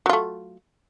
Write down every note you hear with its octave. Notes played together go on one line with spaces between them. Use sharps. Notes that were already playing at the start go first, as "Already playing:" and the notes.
F#3 A3 F4